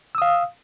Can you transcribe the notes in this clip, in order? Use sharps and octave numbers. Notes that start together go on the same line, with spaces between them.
F5 D#6 E6